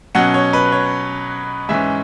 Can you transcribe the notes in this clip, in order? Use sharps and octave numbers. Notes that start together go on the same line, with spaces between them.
B2 F#3 C#4 F#5
C#5
B4
C#5
G#2 E3 C#4 E5